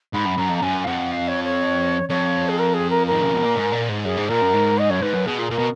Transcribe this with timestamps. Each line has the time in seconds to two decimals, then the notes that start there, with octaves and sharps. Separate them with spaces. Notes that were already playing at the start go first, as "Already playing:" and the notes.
0.14 G#2 B5
0.26 F#2
0.38 F#2 A#5
0.50 F2
0.57 A#5
0.62 F#2 G#5
0.84 F5
0.87 F2 F#5
1.12 F5
1.28 C#5
1.44 C#5
2.09 F2 C#5
2.49 G#4
2.59 A#4
2.74 G#4
2.90 A#4
3.07 D#3 A#4
3.21 C#3
3.34 B2
3.45 A#2
3.56 G#2
3.72 A#2
3.89 G#2
4.05 F#2 G#4
4.17 G#2
4.29 A#2 A#4
4.42 F#2
4.53 G#2
4.78 D#5
4.90 F#2 C#5
5.02 G#2 B4
5.14 F#2
5.26 B2 G#4
5.39 A#2
5.51 A#2 A#4
5.58 B2